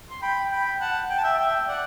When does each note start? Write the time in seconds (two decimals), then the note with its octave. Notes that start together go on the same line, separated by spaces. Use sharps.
0.11 C6
0.22 G5 B5
0.51 G5 B5
0.80 F#5 A5
1.10 G5
1.17 A5
1.24 E5 G5
1.39 E5 G5
1.68 D5 F#5